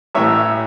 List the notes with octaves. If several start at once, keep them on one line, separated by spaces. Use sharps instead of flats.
A1 A2 E3 C#5 E5